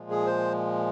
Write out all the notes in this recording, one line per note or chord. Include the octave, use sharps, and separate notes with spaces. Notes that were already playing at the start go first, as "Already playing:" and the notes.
Already playing: A#2 F3 G#3
G#4
C5